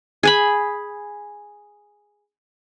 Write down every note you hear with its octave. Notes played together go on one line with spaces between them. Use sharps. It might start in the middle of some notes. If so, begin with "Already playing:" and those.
G#4 G#5 B5